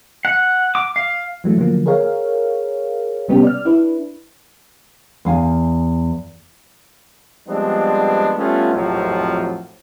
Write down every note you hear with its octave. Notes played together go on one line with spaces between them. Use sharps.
F#5
D6
F5
E3 F#3 A3
D3 F3 F#3 A#3
G#4 A#4 C#5 F5
C3 G3 B3 C#4 G4
D5 F6
D4 E4 B4
E2 F5 G#5
F3 G3 G#3 B3 C4 D4
G3 A3 B3 C#4 F4
A#1 F2 A2 C3 F3 F#3